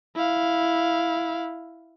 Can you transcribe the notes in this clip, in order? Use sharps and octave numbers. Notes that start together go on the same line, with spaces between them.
E4 F5